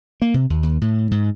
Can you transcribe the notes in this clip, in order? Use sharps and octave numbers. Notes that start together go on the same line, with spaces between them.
A#3
C3
D#2
D#2
A2
G#2